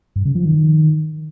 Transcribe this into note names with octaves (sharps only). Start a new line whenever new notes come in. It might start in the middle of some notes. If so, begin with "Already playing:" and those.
G2
C#3
F3
D#3